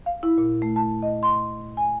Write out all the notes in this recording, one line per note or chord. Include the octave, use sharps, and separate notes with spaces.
F5
E4
A#2
A3
A5
D#5
C6
G#5